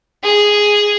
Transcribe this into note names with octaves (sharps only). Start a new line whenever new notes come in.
G#4